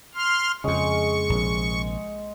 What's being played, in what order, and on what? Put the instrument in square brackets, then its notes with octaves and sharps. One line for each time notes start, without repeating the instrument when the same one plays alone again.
[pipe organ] C6 F6
[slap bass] F2 C#3 [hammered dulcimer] G#3 [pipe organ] C#6
[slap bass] A#1 C3